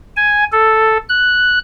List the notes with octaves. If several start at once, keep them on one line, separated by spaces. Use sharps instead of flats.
G#5
A4
F#6